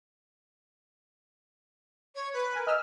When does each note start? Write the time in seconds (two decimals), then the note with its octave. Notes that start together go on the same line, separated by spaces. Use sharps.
2.15 C#5
2.33 B4
2.53 A#4 G#5
2.67 D#5 E6 F6